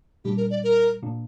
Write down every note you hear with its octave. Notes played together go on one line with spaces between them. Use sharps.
A#2 G3 D4 G4
A#4
D5
A#4
A#2 A#3 D4